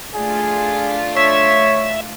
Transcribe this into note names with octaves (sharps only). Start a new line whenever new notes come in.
A3 D4 F4 G#4
C#5 E5